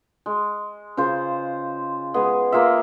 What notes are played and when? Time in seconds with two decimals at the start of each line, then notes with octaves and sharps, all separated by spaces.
0.26 G#3
0.97 C#3 F4 C5
2.14 G#3 B3 G#4
2.52 A#3 F4 G#4 E5